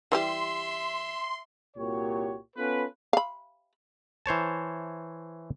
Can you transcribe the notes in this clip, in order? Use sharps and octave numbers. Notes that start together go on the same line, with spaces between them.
E3 G3 G4 E5 C6
C2 A#2 F#4 G4 C#5
B3 C#4 F4 A4 B4
F5 B5
E3 C5 C#5 A5